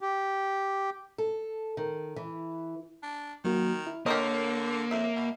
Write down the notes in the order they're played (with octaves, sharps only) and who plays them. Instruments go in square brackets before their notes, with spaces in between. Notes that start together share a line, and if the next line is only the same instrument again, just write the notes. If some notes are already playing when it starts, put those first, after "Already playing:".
[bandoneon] G4
[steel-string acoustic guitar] A4
D#3
E3
[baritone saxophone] D4
[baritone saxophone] D#3 [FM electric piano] F#3 A#3 F#4
[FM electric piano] E4
[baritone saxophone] D3 [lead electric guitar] A#3 [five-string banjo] G4 A#4 D#5 [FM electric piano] C#5 C6
[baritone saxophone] F2 [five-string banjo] E5
[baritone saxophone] B2